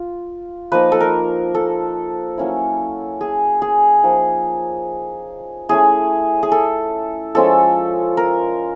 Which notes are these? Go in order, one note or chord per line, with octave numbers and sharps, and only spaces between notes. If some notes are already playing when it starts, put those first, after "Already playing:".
Already playing: F4
F3 A#3 D#4 B4
A4
A#4
A4
F#3 A#3 C#4 E4
G#4
G#4
F3 A#3 D#4
A3 C#4 E4 G#4
G#4
A4
F3 G#3 C#4 F4 A4
A#4